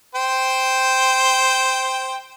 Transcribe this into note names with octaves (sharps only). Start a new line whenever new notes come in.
C5 G5